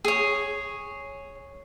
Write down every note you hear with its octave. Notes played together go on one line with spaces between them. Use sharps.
G#4 C#5